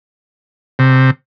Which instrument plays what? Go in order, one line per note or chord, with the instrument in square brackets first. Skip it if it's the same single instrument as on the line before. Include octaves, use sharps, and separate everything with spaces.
[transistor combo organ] C3